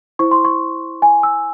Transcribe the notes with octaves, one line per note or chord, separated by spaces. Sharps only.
E4 C5 C#6
C6
C#6
G#5
E6